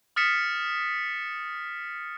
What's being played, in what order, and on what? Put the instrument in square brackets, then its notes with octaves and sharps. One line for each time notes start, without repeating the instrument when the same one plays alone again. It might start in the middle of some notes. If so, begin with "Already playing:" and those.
[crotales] D#6 F6 A6 B6 C#7 E7